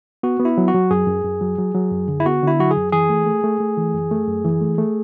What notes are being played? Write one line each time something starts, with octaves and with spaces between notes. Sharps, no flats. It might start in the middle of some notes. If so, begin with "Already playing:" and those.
B3 F#4
B3
E4
F#3
F#4
F#3
F#2 G#4
F#2
F#2
F#3
F#3
F#3
F#2
D3
E4
B3 F#4
D3 E4
F#3 F#4
G#4
F#2
E3 G#4
A3
A3
A3
A3
E3
F#2
A3
F#2
E3
A3
A3